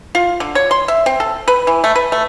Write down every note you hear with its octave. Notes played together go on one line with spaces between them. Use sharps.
F4
D3
C#5
C6
E5
C4
A4
B4
E3
A3
B4
A3